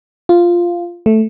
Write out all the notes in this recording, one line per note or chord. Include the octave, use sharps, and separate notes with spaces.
F4
A3